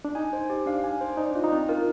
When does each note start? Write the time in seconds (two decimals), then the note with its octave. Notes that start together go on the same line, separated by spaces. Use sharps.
0.05 D4
0.15 D#4 G#5
0.33 C5
0.50 G4
0.66 D4 F5
0.84 G#5
1.01 C5
1.17 D#4 D5
1.31 D4 F4
1.44 D#4
1.52 C4
1.69 F4 A#4